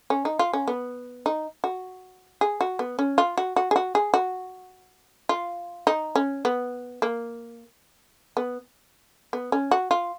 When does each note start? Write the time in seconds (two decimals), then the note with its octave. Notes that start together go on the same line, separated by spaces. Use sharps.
0.10 C#4
0.25 D#4
0.39 F4
0.53 C#4
0.68 B3
1.26 D#4
1.64 F#4
2.41 G#4
2.61 F#4
2.79 B3
2.99 C#4
3.18 F4
3.38 F#4
3.56 F#4
3.71 G#4
3.76 F#4
3.95 G#4
4.14 F#4
5.29 F4
5.87 D#4
6.16 C#4
6.45 B3
7.02 A#3
8.37 B3
9.33 B3
9.52 C#4
9.71 F#4
9.91 F4